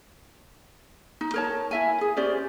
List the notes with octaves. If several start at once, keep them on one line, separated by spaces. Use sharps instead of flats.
D#4
A#4 C#5 A5
E4 E5 G#5
G#4
C#4 G4 C5 D5